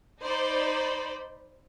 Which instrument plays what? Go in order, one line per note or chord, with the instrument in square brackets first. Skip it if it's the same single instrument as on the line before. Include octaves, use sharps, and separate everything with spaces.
[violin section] D#4 C5 D5 B5